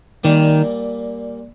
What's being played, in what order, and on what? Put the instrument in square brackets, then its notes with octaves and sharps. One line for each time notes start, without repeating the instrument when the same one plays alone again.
[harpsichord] A#2 G3 A#3 [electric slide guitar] D#3